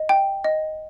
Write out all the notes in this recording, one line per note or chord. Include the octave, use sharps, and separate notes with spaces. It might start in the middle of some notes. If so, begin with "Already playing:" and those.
Already playing: D#5
G5
D#5